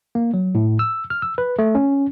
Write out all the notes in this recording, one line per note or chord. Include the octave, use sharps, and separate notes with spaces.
A#3
F#3
A2
E6
F6
E6
B4
A3
C#4